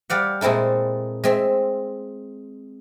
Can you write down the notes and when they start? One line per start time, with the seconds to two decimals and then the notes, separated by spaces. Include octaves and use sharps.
0.10 G3 D5 F5 F#5
0.41 A#2 G#3 C4 E4 A4
1.24 G#3 C4 E5